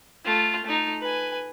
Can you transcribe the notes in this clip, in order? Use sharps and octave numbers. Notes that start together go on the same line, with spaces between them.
A3 F4
A3 D#4
B4 G#5